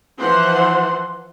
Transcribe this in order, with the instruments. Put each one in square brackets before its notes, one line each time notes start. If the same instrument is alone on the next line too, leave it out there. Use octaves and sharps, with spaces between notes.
[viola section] E3 F3 C5 F#5 C6